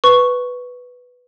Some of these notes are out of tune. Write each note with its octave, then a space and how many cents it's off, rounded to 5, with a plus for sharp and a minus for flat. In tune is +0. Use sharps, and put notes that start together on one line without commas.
B4 +0 C#6 +0